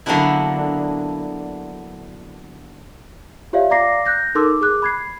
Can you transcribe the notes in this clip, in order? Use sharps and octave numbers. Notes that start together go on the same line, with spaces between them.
D3 F#3 A#3 B3 D4 E4
F4 G4 C#5 D5 E5 F5
D5 F5 A#5 D6 A#6 C7
F#6 G6 A#6
D#4 A4 A#4 C6 D6 E6
G#4 D6 F#6
B5 G#6 C7